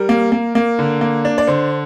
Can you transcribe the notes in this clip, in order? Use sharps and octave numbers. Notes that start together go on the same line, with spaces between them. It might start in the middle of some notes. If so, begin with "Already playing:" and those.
Already playing: G3 A#4
A#3
A#3
A#3
D3
A#3
D4
D5
D3 C5